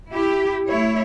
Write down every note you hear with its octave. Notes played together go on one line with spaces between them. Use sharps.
E4 G4
A3 E4 C#5